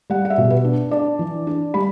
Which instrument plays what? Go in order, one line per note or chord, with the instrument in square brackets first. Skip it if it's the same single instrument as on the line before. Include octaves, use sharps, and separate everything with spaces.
[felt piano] G3 F#5
F#5
E5
B2
B4
D4
D4 D5
E3
D4
G3 B5